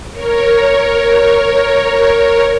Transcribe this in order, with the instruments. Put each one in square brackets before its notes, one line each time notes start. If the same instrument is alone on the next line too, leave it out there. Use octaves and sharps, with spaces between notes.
[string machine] A#4 C#5